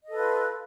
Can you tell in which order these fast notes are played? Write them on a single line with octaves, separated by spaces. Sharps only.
D#5 A4 B4 F4